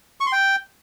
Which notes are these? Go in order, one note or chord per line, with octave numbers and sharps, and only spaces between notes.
C#6
C6
G5